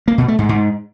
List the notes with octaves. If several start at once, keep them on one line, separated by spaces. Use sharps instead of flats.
A#3
B2
A3
G#2
G#2